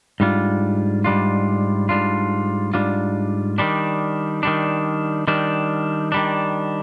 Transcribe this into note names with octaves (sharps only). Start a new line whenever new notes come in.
G#2 G3 D4 F4
G#2 G3 D4 F4
G#2 G3 D4 F4
G#2 G3 D4 F4
D#3 G3 D4
D#3 G3 D4
D#3 G3 D4
D#3 G3 D4